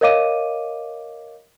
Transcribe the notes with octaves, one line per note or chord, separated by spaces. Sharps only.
A#4 C#5 D#5 F5 D6 D#7